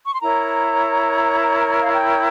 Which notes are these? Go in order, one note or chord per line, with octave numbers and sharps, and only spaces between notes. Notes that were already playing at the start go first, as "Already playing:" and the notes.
C#6
C6
E4 A#4 C#5 A#5
F5
G5